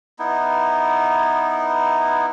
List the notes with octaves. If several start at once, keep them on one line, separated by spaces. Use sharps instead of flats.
B3 D#4 E4